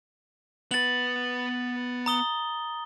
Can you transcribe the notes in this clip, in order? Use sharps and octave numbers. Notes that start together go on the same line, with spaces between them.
B3 B4 A6 F#7
A#5 D#6 G7